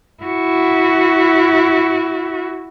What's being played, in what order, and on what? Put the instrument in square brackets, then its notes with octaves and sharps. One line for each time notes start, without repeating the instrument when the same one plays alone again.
[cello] E4 F#4